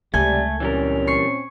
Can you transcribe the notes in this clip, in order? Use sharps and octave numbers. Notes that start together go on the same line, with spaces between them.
C#2 C3 G3 A3 G#5 G#6
A#2 E3 G3 C4 C#4 A#4
C#6 C7 C#7